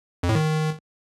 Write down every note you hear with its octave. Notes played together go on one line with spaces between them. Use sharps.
F2
A2
D#3